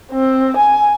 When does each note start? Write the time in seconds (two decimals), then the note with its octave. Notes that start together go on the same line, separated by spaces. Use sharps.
0.11 C4
0.57 G#5